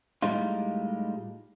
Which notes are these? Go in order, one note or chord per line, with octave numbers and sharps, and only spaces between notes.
A2 G3 G#3 D#4 F4